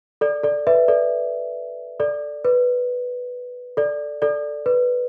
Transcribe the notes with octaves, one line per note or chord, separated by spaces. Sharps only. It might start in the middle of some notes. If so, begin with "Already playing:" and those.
A4 D5
A4 D5
B4 E5
A4 D5
A4 D5
B4
A4 D5
A4 D5
B4